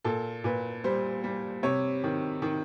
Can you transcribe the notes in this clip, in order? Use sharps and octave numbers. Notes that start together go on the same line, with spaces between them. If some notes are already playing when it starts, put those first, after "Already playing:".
A#2 A4
A#2 B4
G3 C5
G3
C3 C#5
D#3
D#3